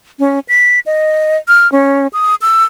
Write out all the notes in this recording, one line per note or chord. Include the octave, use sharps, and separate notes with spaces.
C#4
B6
D#5
F6
C#4
D#6
E6